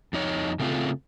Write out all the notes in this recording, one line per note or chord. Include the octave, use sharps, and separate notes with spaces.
F2 D#4 C#5
C#3 A3 C4 D#4 F4